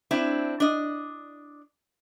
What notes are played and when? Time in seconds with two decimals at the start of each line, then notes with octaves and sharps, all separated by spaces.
0.11 C4 D4 E4
0.60 D4 D#5